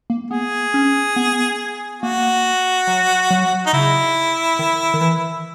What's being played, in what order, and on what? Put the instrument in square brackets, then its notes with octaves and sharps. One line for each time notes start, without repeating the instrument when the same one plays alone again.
[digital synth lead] A#3
[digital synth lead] B3 [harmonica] G#4
[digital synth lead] C#4
B3
[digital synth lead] A#3 [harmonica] F#4
[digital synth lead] F#3
F#3
[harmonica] D#4
[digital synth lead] C#3 [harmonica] E4
[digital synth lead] D#3
D#3
E3